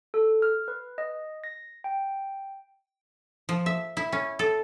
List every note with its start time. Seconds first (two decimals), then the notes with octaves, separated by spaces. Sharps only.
0.14 A4
0.42 F6
0.68 B4
0.98 D#5
1.44 A#6
1.84 G5
3.49 F3
3.66 E5
3.97 E4
4.13 C#4
4.39 A4